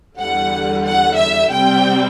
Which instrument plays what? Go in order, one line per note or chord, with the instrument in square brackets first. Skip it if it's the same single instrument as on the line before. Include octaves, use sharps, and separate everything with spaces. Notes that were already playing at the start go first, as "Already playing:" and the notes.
[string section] E2 D3 G3 F#5
F#5
E5
C3 G3 C4 G5